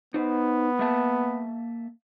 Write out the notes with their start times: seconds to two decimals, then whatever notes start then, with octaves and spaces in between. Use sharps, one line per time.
0.14 B3 D#4 C5
0.79 A#3 E5 A5